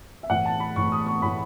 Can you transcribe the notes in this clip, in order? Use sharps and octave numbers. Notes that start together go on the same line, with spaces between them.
E5
A2 E3 F#5
A5
B5
A2 E3 C#6
D#6
C#6
A2 E3 B5